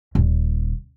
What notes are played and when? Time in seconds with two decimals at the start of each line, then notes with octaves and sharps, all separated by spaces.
0.15 D#1